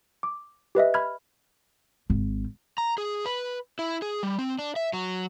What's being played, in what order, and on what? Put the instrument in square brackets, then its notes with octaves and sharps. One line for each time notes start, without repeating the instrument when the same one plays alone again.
[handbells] D6
G4 B4 D#5 E5
B5 F6 G#6
[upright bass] G#1
[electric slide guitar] A#5
G#4
B4
E4
G#4
G3
C4
D4
E5
F#3